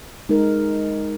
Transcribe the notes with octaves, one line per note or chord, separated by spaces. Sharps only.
G#3 D#4 A#4